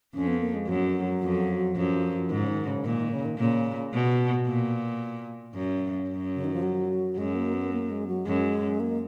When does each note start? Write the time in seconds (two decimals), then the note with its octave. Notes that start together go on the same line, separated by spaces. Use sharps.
0.14 F2 C#4
0.27 B3
0.41 A#3
0.54 G#3
0.67 F#2 F#3
1.23 F2
1.76 F#2 F3
2.30 G#2 D#3
2.43 C#3
2.49 D#3
2.67 C#3
2.85 A#2 D#3
2.98 D#3
3.12 C#3
3.25 D#3
3.38 A#2 C#3
3.93 B2
4.47 A#2
5.55 F#2
6.09 F#2
6.35 C#3
6.44 D#3
6.54 F3
6.63 F#3
7.17 F#2 G#3
7.35 A#3
7.54 B3
7.72 A#3
7.90 G#3
8.08 F#3
8.25 F#2 G#3
8.80 A#3